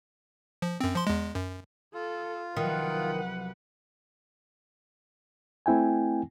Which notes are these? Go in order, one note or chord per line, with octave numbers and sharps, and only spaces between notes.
F3
F#2 C4
F3 C6
E2 G#3
F#2
F4 A4
C2 D#3 F3 F#3 B4 F#5
A3 C4 E4 G5 G#5